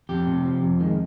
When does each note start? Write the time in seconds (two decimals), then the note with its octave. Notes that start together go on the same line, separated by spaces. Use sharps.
0.09 F2 G4
0.27 C3
0.45 F3
0.62 F2
0.80 D#3 G#3